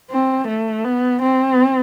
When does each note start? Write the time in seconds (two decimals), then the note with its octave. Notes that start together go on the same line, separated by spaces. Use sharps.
0.11 C4
0.48 A3
0.85 B3
1.22 C4